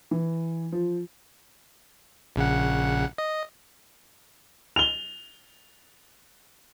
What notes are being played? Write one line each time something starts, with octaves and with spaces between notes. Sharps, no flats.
E3
F3
A#1 C#3 F#5
D#5
F7 G7